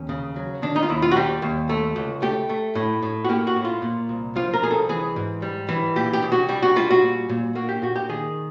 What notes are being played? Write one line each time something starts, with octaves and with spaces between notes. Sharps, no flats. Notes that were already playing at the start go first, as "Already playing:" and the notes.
Already playing: D#2 C#4
C#3
F#3
D#3 D4
D#4
F4
D#2 E4
F4
F#4
G3 G4
D#2
A3
C#2
A3 G4
A3
A2
A2
F#4
A#3 G4
F#4
A2
F4
A#2
C2
F3 F4
A#4
C2 G#4
A4
E3 G#4
G#2
G3
E3
A#2 G4
G4
C2
F#4
G3 G4
F#4
G3 F4
F#4
A#2
A#2
A#3 F#4
G4
A#2 F#4
G4
D#3 G#4